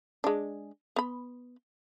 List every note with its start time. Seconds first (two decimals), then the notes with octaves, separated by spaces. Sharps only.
0.24 G#3 D4
0.96 B3 B5